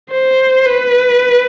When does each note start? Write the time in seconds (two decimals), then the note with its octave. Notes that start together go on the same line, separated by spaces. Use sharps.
0.11 C5
0.66 B4